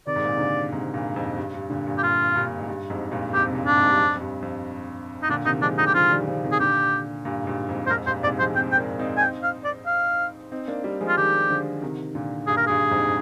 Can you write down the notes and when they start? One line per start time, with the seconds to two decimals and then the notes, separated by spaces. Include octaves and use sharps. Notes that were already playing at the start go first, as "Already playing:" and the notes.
0.07 C3 D#3 D5
0.16 G#2
0.24 A#2
0.31 C3
0.40 A#2 D3
0.72 G#2 C3
0.94 G2 A#2
1.16 F2 G#2
1.38 G2
1.54 G2
1.70 A#2 D3
1.87 G2 A#2
1.98 G4
2.03 G2 A#2 F4
2.35 G2 A#2
2.47 A#2
2.57 G#2
2.68 G2
2.90 F2 G#2
3.12 G2 A#2
3.33 F2 G#2 G4
3.48 C3
3.55 G2 A#2
3.66 D4
3.77 F2 G#2
3.90 G2
3.99 F2
4.15 F2
4.20 G2
4.42 F2
5.22 D#4
5.29 A#2 D3 D4
5.45 C3 D#3 D#4
5.62 F3 G#3 D4
5.78 D#3 G3 D#4
5.86 G4
5.95 D3 F3 F4
6.11 D#3 G3
6.27 D3 F3
6.44 C3 D#3
6.52 G#4
6.60 A#2 D3 G4
7.25 G2 A#2
7.43 G#2
7.47 G2 A#2
7.69 F2 G#2
7.87 C5
7.90 F2 G#2 A#4
8.07 G2 A#2 C5
8.23 G#2 C3 D5
8.39 F3 G#3 C5
8.56 G#3 C4 G5
8.72 G5
8.77 A#3 D4
8.99 C4 D#4
9.18 G#5
9.21 G5
9.43 F5
9.64 D5
9.86 F5
10.52 C4 D#4
10.68 A#3 D4
10.84 G3 A#3
11.01 F3 G#3
11.08 F4
11.17 D#3 G3 G4
11.50 D3 F3
11.82 C3 D#3
12.15 A#2 D3
12.47 G2 A#2 G#4
12.57 A#4
12.67 G2 G#4
12.91 F2 G#2